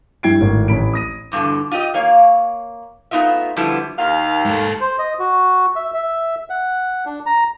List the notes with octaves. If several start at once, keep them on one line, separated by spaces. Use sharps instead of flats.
G2 E4 G5 G#6 C7 D7
G#1 A2
A1 B5 D7
D#6 A#6 D#7
E2 G2 B2 D3
F4 G4 D#5
A#3 C#5 F5
A3 B3 D#4 F4 E5
D3 F3 G3 A3 B3 E4
D#2 F5
G#2 A4
C5
D#5
F#4
E5
E5
F#5
D4
A#5